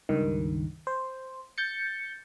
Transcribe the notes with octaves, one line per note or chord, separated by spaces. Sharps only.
C#2 G2 D#3
C5
G6 A6 C#7